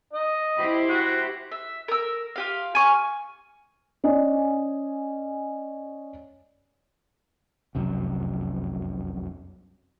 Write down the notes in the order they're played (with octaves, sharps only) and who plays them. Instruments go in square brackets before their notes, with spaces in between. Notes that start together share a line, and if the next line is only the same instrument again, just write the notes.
[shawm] D#5
[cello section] E4 G4 C5
[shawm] F#4
[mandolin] E5
A#4 E6
F4 G4 F5
G#5 C#6 F6
[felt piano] C#4 D5 D#5 G#5
[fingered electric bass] F1 C2 F#2